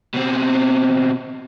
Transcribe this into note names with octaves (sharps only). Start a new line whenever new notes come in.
B2 C4